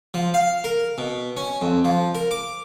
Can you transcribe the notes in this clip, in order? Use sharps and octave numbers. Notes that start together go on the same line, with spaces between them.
F3
F5
A#4
B2
C#4
F2
F3
A#4
D6